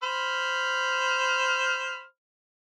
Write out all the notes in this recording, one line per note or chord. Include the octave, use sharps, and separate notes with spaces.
C5 B5 F6